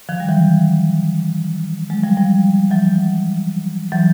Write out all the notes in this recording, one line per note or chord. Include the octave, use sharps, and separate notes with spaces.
D#3 F3
G3
E3 F#3
F#3 G#3
F3 G3
F3 G3
E3 F#3
E3 F#3